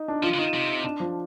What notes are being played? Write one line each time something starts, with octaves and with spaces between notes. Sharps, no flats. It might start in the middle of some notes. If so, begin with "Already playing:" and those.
Already playing: D#4
D4
F3 F4
D3
D#3 D#4
C3
D4
F3